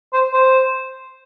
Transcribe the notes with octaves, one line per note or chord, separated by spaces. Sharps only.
C5
C5